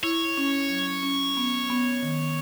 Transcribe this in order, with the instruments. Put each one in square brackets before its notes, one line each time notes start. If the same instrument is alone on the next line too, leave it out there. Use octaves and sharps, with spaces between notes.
[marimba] E4 [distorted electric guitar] C#5
[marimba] C#4
F#3
C#4
B3
B3
D#3